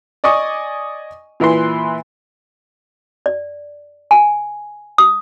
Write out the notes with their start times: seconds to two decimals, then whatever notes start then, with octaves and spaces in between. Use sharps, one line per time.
0.24 D5 D#5 G#5 C#6 D#6
1.40 A#2 E3 E4 B4 C6
3.26 D5
4.11 G#5
4.98 D#6